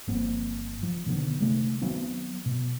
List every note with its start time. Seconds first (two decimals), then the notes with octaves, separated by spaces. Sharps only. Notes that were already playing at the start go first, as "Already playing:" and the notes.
0.07 G1 F3 A#3 C4
0.83 F3
1.06 B2 D3 D#3 B3
1.40 C3 D#3 G#3 A3
1.82 D#3 F#3 B3 C4
2.46 B2